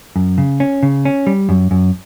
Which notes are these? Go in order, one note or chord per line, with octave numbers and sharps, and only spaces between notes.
F#2
C#3
C#4
C#3
C#4
G3
F#2
F#2